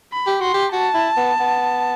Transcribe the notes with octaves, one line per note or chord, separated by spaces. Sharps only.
B5
G4
F#4 C6
G4
F#4 A5
E4
B3
B3